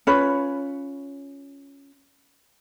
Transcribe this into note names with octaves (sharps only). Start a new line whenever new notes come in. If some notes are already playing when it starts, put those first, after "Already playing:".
C#4 F4 B4 C#5